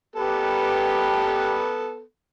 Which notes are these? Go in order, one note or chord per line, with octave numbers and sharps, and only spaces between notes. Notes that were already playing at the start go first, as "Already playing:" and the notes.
G3 A#3 B3 G4 A4 B4